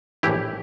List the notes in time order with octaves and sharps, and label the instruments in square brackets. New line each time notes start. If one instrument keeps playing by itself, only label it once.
[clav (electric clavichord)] A#1 A2 E3 E4 G4